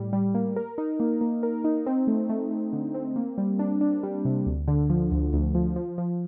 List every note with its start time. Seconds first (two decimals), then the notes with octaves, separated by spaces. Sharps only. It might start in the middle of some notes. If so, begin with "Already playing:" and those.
Already playing: A2 G3
0.13 G3
0.34 A#3
0.56 A#4
0.78 D#4
1.00 A#3
1.21 A#3
1.43 A#4
1.64 D#4
1.86 C4
2.07 A3
2.29 A3
2.51 A3
2.73 D3
2.94 C4
3.16 A#3
3.38 G3
3.59 D4
3.81 D4
4.03 G3
4.25 C3
4.46 D2
4.68 D3
4.90 F3
5.11 D2
5.33 D2
5.55 F3
5.76 F3
5.98 F3